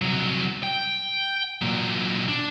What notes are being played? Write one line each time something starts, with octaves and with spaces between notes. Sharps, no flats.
C2 F#3
G5
A#2 F#3
D4